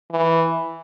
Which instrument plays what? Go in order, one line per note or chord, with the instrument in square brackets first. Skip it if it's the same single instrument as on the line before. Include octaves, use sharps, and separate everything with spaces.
[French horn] E3